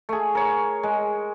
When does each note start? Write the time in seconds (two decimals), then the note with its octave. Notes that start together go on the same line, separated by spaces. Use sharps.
0.09 A3 G#4
0.35 A#4 C#5
0.83 G#3